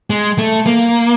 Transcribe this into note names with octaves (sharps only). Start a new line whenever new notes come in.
G#3
A3
A#3